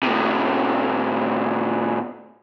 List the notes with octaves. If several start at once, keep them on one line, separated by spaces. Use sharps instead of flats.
A2 C3